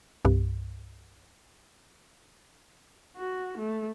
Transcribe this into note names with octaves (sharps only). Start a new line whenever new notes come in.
C2 G2
F#4
A3